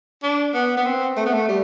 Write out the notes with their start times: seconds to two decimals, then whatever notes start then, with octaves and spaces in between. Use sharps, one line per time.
0.23 D4
0.54 B3
0.77 B3
0.85 C4
1.17 A3
1.26 B3
1.33 A3
1.48 G3